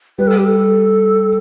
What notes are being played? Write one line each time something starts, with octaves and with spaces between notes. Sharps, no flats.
G3 B4
A4
G4
A4